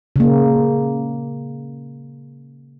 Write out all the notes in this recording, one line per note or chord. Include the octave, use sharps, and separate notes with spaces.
C#3 A#3